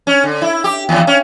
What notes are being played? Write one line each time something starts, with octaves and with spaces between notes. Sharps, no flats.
C#4
D3
E4
G4
D#2
C#4